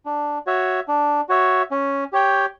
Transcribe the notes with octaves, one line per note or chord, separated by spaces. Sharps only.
D4
F#4 C#5 E5
D4
F#4 C#5 E5
C#4
G4 C#5 G5